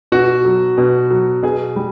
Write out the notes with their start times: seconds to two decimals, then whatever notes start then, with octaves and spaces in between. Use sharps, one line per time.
0.12 B2 F#4
0.45 F#3
0.78 B2
1.10 F#3
1.43 B2 G#4
1.76 G3